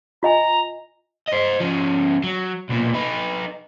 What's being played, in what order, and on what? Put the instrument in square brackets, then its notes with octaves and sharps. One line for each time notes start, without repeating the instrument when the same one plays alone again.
[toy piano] F4 D#5 G#5 [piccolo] A#5
[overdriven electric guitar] C5 D#5
F3 C#4
F#3
B1 A#2
D#4 B4